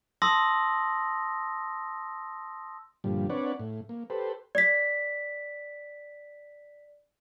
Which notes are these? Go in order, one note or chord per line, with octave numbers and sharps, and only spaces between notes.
A5 C6 D#6 E6 A#6
G2 A#2 D3 F3 G3
C4 D4 B4 C#5 D5 F#5
A2
A#3
G4 A4 B4 C5
D5 B6